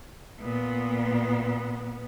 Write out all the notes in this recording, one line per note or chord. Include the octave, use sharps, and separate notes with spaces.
A#2 B3